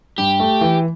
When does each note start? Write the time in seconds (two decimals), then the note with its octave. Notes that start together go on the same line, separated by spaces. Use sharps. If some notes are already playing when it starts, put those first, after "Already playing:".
0.18 G2 G4
0.40 A3
0.61 E3